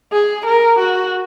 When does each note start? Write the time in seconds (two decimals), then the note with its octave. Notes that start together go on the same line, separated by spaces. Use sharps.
0.13 G#4
0.46 A#4
0.79 F#4